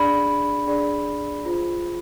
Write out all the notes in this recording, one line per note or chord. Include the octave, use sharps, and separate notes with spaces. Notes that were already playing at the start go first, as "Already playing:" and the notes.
Already playing: D4 G#4 D5 B5
D4 G#4 D5
F4 G#4 C5